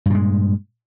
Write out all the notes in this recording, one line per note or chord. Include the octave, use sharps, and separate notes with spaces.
G2 A#2 G#3